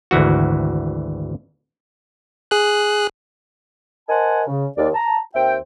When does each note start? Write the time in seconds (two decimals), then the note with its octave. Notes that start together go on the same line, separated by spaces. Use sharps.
0.11 G#1 D2 E3 F#4
2.51 G#4 F#6
4.09 A#4 C5 D#5 F#5 G#5 A5
4.48 C#3
4.78 D#2 D5
4.95 A5 A#5
5.35 D#2 C4 E5 G5